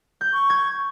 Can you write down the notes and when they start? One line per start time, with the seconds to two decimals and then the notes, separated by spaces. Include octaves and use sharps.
0.21 G6
0.33 C#6
0.50 G#6